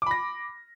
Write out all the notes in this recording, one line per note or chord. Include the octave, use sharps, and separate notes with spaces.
B5 D6 A#6